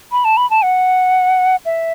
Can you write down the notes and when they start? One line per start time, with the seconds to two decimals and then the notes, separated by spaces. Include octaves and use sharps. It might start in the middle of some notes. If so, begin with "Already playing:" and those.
0.12 B5
0.24 A5
0.37 B5
0.50 A5
0.63 F#5
1.65 E5